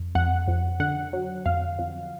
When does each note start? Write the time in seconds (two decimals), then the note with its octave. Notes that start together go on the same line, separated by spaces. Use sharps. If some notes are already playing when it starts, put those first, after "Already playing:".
Already playing: F2
0.15 F2 F#5
0.48 F2
0.80 D3 F#5
1.13 F#3
1.46 F2 F5
1.79 F2